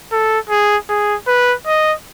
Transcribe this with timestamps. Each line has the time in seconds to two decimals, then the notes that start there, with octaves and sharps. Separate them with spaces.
0.12 A4
0.50 G#4
0.89 G#4
1.27 B4
1.67 D#5